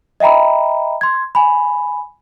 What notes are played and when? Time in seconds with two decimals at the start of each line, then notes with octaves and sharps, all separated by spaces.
0.20 D#5 E5 G5 A#5 B5
1.01 C6 G#6
1.35 G#5 B5